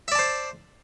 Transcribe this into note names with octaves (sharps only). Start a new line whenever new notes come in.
C5 D5 E5 A5